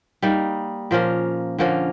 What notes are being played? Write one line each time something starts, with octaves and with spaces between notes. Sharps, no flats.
G3 A#3 D#4
A#2 F3 A#3 C#4
D3 F3 A#3 C#4